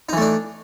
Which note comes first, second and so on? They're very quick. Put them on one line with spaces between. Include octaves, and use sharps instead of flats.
D#4 E3 A3 D4